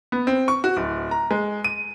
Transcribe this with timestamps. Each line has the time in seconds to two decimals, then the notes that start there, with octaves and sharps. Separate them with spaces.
0.12 B3
0.27 C4
0.48 C#6
0.64 F#4
0.77 D1
1.11 A#5
1.31 G#3
1.64 D#7